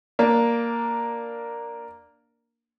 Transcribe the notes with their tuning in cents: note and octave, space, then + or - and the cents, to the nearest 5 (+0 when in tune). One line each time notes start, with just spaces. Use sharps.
A#3 +0 D4 +0